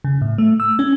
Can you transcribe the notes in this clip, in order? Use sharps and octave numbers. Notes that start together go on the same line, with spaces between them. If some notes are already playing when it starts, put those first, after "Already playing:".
C#3
A2
A3
E6
C#4